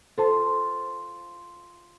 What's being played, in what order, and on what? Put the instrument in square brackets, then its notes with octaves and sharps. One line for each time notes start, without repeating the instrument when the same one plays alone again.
[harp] F4 [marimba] A4 C5 A5